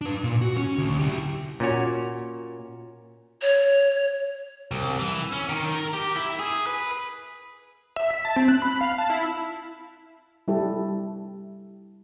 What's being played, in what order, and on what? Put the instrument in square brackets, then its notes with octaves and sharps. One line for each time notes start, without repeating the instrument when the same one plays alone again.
[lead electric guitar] D4 B4
A#2
F#4
C#4
D2
E4 G4
[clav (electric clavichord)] A#2 C#4 F#4 C#5
[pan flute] C#5
[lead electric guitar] C2
E3
C#4
D#3
A#4
G4
E4
G#4
B4
[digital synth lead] E5
B6
A5
C4
F#6
B5
F5
A5
E4
[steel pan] G3 E4 G4 A4